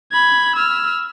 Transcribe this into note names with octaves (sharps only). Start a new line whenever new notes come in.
B5 G#6
E6 F6